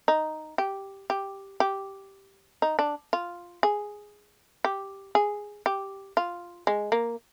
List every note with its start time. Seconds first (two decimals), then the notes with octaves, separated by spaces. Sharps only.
0.08 D#4
0.58 G4
1.10 G4
1.60 G4
2.62 D#4
2.79 D4
3.13 F4
3.63 G#4
4.64 G4
5.15 G#4
5.66 G4
6.17 F4
6.67 G#3
6.92 A#3